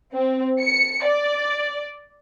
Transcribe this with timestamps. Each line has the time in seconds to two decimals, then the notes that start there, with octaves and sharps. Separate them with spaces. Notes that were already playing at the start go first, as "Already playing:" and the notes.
0.12 C4
0.62 C#7
1.04 D5